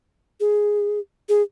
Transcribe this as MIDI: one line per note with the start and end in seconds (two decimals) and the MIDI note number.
0.40 0.99 68
1.29 1.42 68